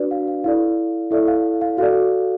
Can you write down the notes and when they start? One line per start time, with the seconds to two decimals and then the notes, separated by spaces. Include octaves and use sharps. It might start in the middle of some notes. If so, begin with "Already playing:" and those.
Already playing: D4 F#4 B4 D5
0.11 F5
0.28 F5
0.44 E4 A4 D5 F5
1.11 E4 A4 D5 E5
1.27 F5
1.61 F5
1.78 F#4 A4 D5 F5